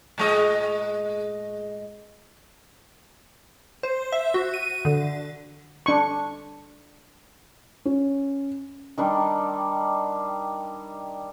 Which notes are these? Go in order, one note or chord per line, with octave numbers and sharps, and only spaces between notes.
A2 G#3 D#5
C5
E5
F#4
D#7
D3
D4 C#6
C#4
D#3 G3 D4 C6